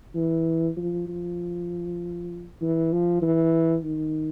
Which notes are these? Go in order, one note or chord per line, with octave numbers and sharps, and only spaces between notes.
E3
F3
F3
E3
F3
E3
D#3